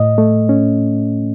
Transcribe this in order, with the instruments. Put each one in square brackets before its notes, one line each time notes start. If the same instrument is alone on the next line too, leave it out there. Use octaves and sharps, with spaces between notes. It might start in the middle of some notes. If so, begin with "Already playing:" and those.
Already playing: [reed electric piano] A2 D#5
A3
C#4